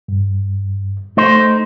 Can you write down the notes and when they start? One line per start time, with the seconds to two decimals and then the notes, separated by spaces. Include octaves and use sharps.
0.08 G2
1.17 A3 D#4 C5